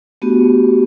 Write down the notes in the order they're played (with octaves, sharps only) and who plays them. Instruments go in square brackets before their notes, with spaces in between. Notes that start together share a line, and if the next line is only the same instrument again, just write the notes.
[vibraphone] A3 B3 D4 F#4 G4